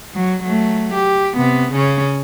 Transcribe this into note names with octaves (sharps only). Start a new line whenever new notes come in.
F#3
F#3 A3
G4
C3 B3
C#3 C#4